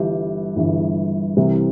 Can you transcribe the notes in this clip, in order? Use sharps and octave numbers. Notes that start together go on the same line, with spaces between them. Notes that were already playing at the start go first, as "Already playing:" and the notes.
Already playing: G1 G2 E3 G4
G1 G2 E3
C2 C3 E3